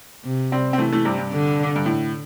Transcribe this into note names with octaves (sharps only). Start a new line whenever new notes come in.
C3
G3 C4
C4
E3 A3
E3 A3
G2 C3
G2
D3
G2
A2